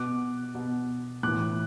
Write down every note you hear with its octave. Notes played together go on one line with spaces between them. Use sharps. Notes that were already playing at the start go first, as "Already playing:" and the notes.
Already playing: B2 D6 F#6
B2
A2 E3 D6 F#6